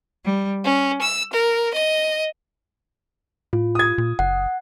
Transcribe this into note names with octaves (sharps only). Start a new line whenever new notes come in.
G3
C#4
E6
A#4
D#5
A2 F4
D#6 G#6
A#2
F#1 F#5